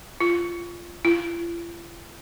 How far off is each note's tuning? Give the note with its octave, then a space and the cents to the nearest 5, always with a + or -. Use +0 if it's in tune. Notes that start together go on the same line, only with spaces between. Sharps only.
F4 -10
F4 -45